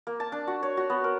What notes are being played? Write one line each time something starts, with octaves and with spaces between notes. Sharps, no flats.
A#3
A5
D4
F#4
C#5
F#4
B3
A#4